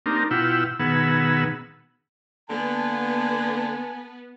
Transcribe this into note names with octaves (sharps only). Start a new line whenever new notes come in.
A#3 C4 D4 D#4 G4 A#4
B2 E4 F4 F#5 G5 E6
B2 D#3 B3 G#4 F#5 E6
D3 A#3 B3 B4 G#5 A5